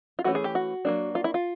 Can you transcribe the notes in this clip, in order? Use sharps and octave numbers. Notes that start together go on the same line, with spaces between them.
F4
E3 A3 C#4 F#4
G#4
G4
F#4
F#3 A#3 D4
F4
E4
F4